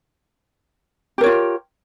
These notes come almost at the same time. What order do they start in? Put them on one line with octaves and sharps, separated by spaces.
G4 A#4 C#5 F4